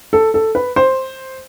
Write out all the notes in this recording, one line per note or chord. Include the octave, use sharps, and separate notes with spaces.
A4
A4
B4
C5